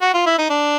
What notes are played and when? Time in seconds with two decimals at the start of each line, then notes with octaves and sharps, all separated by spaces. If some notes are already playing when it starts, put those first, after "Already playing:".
0.02 F#4
0.14 F4
0.26 E4
0.38 D#4
0.50 D4